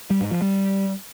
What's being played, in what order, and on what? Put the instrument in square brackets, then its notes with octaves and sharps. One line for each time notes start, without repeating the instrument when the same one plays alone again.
[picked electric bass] G3
G#2
F3
G3